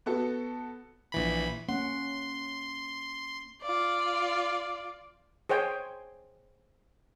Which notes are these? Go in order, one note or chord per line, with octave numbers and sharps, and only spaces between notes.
B3 F#4 A4
A#1 E3 B5
A#3 C#4 F#5 C6
F4 D5
G#4 C5 C#5 G5